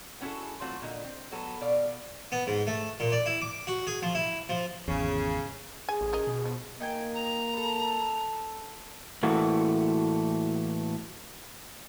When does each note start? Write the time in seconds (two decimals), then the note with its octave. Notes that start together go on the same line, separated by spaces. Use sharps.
0.21 B3 C#4 E4 F#4 G#4 A4
0.61 E3 F#3 A3 C4 F4 F#4
0.82 A#2 D3 D#5
1.04 C4
1.32 F#3 B3 A4
1.61 B2 D5 F5
2.32 B3
2.47 G#2
2.67 A3
3.00 A#2
3.12 D5
3.26 E4
3.42 D6
3.67 F#4
3.87 G#4
4.02 F3
4.15 E4
4.49 F3
4.88 G#1 E2 C#3
5.89 G#4 G#5
6.01 A1
6.13 C#4 A#4 D#5
6.27 B2
6.45 F3
6.80 A#3 D#4 G5 G#5
7.14 A#5
7.53 A4 B5
9.23 A2 E3 A3 A#3 F#4